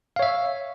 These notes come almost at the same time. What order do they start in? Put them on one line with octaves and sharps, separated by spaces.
F5 C#5 E5